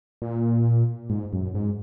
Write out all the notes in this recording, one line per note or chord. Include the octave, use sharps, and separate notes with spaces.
A#2
G#2
F#2
G#2